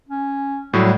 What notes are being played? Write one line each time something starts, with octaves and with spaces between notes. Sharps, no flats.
C#4
A2 F#3 G3